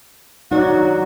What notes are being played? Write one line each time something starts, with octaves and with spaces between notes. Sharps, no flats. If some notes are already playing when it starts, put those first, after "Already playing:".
F#3 D#4 F#4 D5